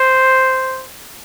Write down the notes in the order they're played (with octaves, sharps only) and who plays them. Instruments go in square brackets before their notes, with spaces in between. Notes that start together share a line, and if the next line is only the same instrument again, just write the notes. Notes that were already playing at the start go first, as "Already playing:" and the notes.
Already playing: [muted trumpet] C5